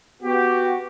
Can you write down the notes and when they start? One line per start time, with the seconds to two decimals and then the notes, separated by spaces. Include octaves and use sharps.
0.23 B3 F#4 G4